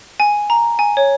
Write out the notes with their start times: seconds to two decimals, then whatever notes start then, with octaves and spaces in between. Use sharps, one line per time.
0.20 G#5
0.50 A#5
0.79 G#5
0.97 C#5